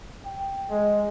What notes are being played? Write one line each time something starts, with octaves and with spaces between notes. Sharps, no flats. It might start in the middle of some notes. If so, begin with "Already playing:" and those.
G5
G#3